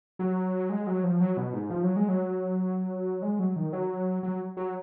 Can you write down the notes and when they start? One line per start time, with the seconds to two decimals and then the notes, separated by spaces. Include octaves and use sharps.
0.19 F#3
0.69 G#3
0.87 F#3
1.03 F3
1.20 F#3
1.37 B2
1.53 G#2
1.70 F3
1.83 F#3
1.96 G#3
2.08 F#3
3.22 G#3
3.39 F#3
3.56 D#3
3.73 F#3
4.23 F#3
4.57 F#3